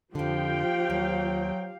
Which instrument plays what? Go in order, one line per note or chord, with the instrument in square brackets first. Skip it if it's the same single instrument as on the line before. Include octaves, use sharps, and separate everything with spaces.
[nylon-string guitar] F2 D3 [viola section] F3 G5 [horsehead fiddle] G4 F5
[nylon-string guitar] D#2 [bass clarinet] F#3